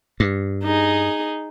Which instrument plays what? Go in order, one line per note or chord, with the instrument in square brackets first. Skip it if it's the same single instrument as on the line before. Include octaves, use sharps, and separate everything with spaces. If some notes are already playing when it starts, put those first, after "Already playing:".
[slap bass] G2
[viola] D#4 G#4